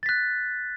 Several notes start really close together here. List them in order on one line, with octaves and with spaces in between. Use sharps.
A6 B6 F#6